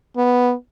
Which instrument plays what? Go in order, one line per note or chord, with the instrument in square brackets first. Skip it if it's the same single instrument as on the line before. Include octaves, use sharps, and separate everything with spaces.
[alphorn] B3